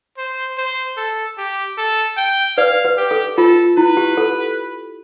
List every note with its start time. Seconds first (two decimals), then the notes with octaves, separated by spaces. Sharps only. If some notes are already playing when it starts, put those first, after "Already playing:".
0.18 C5
0.58 C5
0.97 A4
1.38 G4
1.78 A4
2.17 G5
2.58 B4 D5 F5
2.85 B4
2.97 G4
3.11 A4
3.37 F4 A4
3.77 E4 B4
3.97 G4
4.17 A4